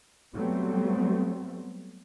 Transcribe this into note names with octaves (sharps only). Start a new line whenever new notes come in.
F#3 G3 A3 B3 C4